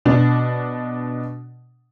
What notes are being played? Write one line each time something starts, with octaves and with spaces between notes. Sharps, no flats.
B2 D4